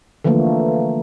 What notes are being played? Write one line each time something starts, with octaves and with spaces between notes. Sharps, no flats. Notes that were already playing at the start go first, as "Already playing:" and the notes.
D3 E3 F3 A3 A#3